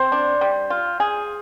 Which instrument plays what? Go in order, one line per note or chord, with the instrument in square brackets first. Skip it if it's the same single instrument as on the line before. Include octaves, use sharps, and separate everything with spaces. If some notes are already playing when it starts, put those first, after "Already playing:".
Already playing: [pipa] C4 [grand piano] C5
[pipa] D4
G3
F4
G#4